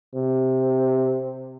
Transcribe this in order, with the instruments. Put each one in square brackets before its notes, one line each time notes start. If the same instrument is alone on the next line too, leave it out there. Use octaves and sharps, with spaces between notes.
[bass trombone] C3